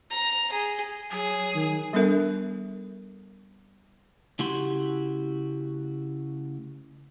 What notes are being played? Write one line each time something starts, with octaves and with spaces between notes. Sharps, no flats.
A#5
G#4
F#3 G#4
D#3
G3 B3 D4 A4 A#4 E5
C#3 A3 E4 F#4 G4 C6